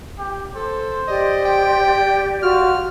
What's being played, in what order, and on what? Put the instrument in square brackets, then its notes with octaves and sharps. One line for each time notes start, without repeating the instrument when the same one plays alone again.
[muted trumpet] G4
[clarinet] A4 [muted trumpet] C5
[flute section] G4 D5 [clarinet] D#5
[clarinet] G5
[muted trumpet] F4 [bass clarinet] F#4 [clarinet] F6